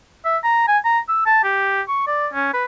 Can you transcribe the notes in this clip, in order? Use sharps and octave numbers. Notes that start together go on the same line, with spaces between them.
E5
A#5
G#5
A#5
E6
A5
G4
C#6
D5
C#4
B4